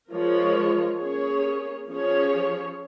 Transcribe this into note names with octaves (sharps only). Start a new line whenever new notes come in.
F3 G#3 F4 A#4 C#5
A#3 C#4 G#4 C#5
F3 C#4 G#4 C#5